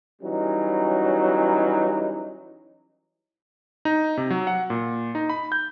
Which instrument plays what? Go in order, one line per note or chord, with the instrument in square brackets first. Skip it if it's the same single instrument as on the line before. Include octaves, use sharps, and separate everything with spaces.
[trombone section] E3 F#3 G3 C#4 D#4
[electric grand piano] D#4
C3
F#3
F#5
A#2
D#4
B5
G6